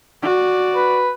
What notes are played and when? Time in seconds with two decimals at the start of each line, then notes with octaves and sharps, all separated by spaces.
0.22 F#4 D5
0.75 B4